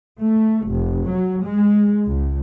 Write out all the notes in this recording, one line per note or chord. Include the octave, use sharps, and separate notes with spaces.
A3
F1
F#3
G#3
C#2